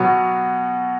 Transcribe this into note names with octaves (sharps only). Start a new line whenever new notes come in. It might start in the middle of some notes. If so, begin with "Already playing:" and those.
Already playing: B2 F#3 B3